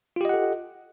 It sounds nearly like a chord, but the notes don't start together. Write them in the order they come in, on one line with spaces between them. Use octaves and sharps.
F4 G4 D#5 F#5 A4